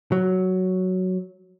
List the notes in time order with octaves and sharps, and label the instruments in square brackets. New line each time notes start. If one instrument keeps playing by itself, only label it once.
[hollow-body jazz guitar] F#3